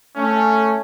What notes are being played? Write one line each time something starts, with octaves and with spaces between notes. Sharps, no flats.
A3 C#4